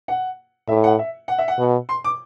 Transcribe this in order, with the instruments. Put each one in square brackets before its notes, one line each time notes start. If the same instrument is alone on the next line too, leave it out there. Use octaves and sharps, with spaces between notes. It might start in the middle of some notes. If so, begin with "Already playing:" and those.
[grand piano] F#5
[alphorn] A2 [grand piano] E5
[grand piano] F#5
E5
F#5
E5
F#5
[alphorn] B2
[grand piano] C6
D6